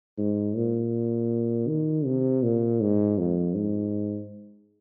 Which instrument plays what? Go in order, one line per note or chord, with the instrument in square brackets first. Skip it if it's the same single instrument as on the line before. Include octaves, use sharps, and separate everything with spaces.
[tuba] G#2
A#2
D#3
C3
A#2
G#2
F2
G#2